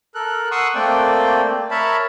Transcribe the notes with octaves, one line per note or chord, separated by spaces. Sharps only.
A4 A#4 F#6
F#5 C6 C#6 D#6 E6 F#6
A3 A#3 C4 D5 G5
A#4 C#5 E5 A5 B5